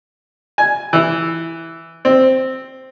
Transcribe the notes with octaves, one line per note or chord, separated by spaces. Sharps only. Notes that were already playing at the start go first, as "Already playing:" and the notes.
G#5
E3
C4